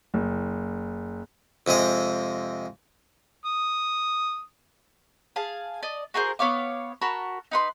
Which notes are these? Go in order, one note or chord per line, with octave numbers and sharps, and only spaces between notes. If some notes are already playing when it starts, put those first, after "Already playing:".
F#1
F2 C3 G#3 D#5
D#6
G#4 F5 A5
D5 D#5
F#4 G#4 A#4 C5
B3 C#5 F5 D6
F#4 A#4 A5 B5
D#4 B4 C6